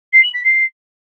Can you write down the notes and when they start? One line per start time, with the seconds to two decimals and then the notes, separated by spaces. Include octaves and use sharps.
0.13 C7
0.23 F#7
0.34 B6
0.44 C7